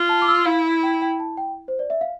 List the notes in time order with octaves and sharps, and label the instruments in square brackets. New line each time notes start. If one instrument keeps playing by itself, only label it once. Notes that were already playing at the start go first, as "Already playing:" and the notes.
Already playing: [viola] F4
[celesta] A5
D6
E6
[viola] E4 [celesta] F5
[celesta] G5
G5
A5
G5
C5
D5
E5
F5